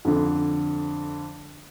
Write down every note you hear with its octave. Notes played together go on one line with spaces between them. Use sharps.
F2 D3